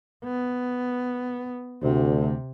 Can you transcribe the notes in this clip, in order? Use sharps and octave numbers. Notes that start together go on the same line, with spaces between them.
B3
D2 C3